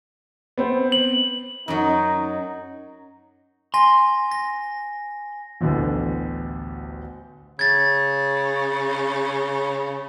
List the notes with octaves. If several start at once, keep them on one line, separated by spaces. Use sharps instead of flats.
B3 C4 C5
F#7
F#2 F#3 D#4
G#5 C6 A#6
A#6
A1 D2 B2 D3 E3
C#3 G#6 A6